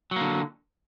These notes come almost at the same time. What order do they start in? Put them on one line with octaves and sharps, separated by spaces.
F#3 A#3 D3